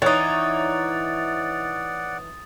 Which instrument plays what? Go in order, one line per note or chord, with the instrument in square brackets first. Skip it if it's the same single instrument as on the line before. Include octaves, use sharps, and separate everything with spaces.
[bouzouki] E3 D#4 [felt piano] C#5 [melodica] D5 F#5 [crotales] D#6 A6